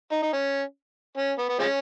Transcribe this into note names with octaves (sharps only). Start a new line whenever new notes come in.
D#4
D#4
C#4
C#4
B3
B3
F3 G#3 C#4